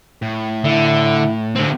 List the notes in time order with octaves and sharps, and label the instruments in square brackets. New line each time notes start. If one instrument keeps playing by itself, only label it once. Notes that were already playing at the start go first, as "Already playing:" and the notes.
[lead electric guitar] A2
[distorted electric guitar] D3 [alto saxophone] E4
[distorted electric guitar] D3 C4